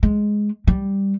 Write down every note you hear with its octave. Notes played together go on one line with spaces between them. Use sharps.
G#3
G3